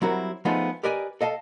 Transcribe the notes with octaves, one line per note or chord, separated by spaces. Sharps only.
F#3 G3 C4 E4 F#4 A#4
F3 G#3 A3 B3 D#4 F4
G4 A#4 B4 D5 D#5 G#5
A4 D#5 F5 A5